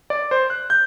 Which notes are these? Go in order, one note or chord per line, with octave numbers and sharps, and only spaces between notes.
D5
C5
F#6
G6